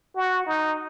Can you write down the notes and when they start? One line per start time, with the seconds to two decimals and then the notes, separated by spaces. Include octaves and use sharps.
0.16 F#4
0.46 D#4